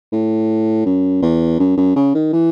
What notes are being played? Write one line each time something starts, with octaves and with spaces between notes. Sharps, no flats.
A2
F#2
E2
F#2
F#2
C#3
D#3
E3